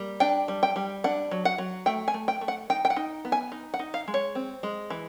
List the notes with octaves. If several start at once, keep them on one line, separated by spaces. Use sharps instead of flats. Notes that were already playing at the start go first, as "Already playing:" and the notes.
Already playing: G3 A#3
D4 G5
G3
G5
G3
D4 F#5
F#3
F#5
F#3
A3 G5
G#5
A3
G5
A3
F#5
D#4 G5
G5
F#5
D#4
B3
G#5
D#4
F#5
D#4
F5
G#3
C#5
C4
G#3
E3